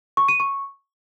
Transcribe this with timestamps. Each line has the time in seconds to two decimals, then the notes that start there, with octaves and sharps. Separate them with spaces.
0.17 C#6
0.28 D#7
0.40 C#6